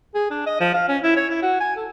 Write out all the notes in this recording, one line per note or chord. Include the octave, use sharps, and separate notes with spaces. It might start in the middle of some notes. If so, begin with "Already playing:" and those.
G#4
D4
D#5
F3
F5
C#4
E4
C#5
E4
F#4
G#5
A4